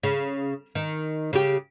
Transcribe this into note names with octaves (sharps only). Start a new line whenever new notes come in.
C#3
D#3
C#3 G4